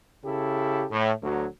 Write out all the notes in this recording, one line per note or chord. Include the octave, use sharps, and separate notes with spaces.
C#3 E4 G4 A4
A2
D2 F#3